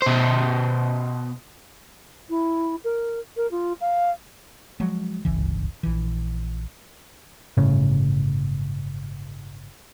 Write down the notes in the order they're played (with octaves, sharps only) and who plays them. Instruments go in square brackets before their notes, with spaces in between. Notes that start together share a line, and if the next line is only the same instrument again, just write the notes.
[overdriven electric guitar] B2 C5
[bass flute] E4
A#4
A#4
F4
F5
[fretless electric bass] F3 F#3 G#3
D1 G1 C#2 E3
A#1 E3
[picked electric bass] G1 A2 C#3 C#4